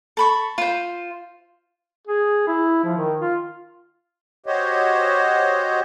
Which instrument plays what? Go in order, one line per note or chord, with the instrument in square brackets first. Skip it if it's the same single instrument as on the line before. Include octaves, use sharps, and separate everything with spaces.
[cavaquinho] A4 B5 C#6
F4 C5
[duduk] G#4
E4
F3
D#3
F4
[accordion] F#4 G4 C5 C#5 D#5